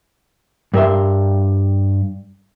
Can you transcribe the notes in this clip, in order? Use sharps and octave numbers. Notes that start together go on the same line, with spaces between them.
G2 A#4 E5 C6